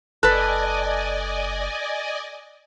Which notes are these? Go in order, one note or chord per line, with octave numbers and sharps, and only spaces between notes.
F#1 A4 B4 D5 D#5 G#5 F#6